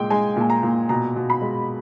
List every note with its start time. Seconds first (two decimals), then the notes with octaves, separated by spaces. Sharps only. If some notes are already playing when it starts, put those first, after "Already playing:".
Already playing: A#2 G#3 G5
0.10 G#3 G#5
0.36 A#2 G#5
0.50 A#5
0.63 A#2
0.89 B2 A#5
1.16 B2
1.30 B5
1.42 G#3